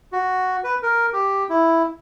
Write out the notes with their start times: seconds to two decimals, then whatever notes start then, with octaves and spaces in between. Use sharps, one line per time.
0.12 F#4
0.64 B4
0.82 A#4
1.13 G4
1.50 E4